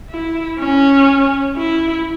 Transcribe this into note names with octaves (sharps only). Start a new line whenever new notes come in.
E4
C#4
E4